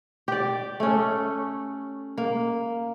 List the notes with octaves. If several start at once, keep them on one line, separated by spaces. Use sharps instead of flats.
G4 D5
A3 C#4
A#3